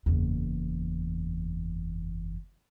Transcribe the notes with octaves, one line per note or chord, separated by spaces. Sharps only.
F#1 E2